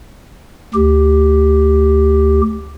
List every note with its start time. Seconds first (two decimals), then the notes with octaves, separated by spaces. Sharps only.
0.74 D2 G4